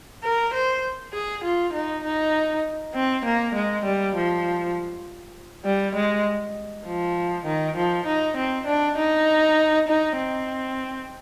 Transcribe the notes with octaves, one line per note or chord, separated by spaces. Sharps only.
A#4
C5
G#4
F4
D#4
D#4
C4
A#3
G#3
G3
F3
G3
G#3
F3
D#3
F3
D#4
C4
D4
D#4
D#4
C4